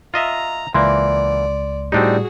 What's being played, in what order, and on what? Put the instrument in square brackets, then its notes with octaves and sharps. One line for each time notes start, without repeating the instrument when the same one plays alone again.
[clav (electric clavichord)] F4 D#5 E5 [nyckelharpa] A#5
[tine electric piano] C#2 [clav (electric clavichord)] E3 A#3 [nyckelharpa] D5 [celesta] C6
[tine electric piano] A2 G3 [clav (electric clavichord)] C4 D4 D#4 [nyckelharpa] F#4 G#4